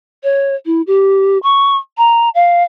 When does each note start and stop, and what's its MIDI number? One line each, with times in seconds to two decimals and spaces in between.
0.23 0.55 73
0.66 0.82 64
0.87 1.38 67
1.43 1.76 85
1.97 2.29 82
2.35 2.63 77